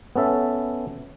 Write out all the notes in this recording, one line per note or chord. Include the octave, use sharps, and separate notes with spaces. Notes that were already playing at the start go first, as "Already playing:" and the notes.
B3 C#4 A4 E5